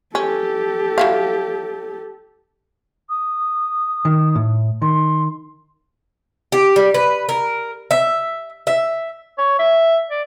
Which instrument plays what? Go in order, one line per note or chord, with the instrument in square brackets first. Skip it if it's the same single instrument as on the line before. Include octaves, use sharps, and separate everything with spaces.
[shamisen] C#4 [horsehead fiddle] G4 A4
[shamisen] F#3 E4 F5
[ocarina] D#6
[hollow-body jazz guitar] D#3
A2
[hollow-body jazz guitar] D#3 [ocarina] C6
[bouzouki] G4
G3
B4
A#4
E5
E5
[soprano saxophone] C#5
E5
D5